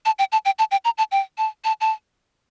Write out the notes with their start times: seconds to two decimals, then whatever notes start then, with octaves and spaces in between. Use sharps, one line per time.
0.06 A5
0.19 G5
0.32 A5
0.45 G5
0.59 A5
0.71 G5
0.85 A#5
0.98 A5
1.12 G5
1.38 A5
1.64 A5
1.81 A5